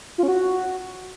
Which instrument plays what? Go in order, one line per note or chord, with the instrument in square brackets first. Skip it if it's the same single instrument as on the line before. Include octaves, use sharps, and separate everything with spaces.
[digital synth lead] F4
C#4
F#4